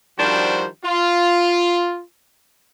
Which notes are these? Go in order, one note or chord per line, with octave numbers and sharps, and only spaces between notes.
D#3 F3 G3 D4 F#4 C5
F4